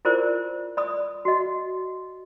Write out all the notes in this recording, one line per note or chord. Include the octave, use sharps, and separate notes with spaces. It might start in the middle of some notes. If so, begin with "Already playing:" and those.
E4 F4 G#4 A#4 C5 D5
D5 B5 D#6
F#4 D#5